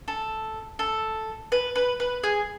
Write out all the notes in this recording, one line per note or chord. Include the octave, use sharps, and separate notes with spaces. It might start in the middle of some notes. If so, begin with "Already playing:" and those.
A4
A4
B4
B4
B4
G#4